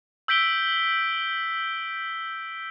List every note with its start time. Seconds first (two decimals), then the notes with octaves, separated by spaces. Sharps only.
0.28 E6 G6 B6 D7 G7